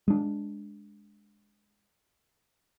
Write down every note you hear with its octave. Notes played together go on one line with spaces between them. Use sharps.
G#3 D4